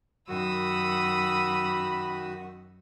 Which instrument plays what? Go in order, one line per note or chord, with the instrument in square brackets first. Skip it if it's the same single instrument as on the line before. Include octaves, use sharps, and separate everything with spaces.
[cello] F#2 [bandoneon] D#3 F#4 [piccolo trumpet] B5 [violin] D#6 E6